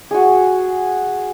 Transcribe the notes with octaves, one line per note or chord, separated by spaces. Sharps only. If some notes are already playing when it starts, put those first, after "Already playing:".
F#4 G#4